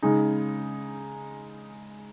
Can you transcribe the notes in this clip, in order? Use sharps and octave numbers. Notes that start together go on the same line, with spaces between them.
C#3 G#3 D#4 G#4